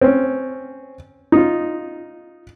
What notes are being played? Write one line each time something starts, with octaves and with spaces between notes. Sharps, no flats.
C4 C#4
D#4 F4